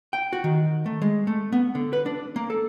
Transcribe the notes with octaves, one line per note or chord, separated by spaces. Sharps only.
G5
F#4
D#3
A3
G#3
A3
B3
D3
B4
D4
A#3
A4